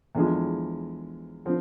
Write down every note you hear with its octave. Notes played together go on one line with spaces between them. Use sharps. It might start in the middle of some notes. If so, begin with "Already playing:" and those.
E2 D3 F3 G#3
D3 F3 C4